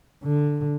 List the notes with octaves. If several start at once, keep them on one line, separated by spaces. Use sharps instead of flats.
D3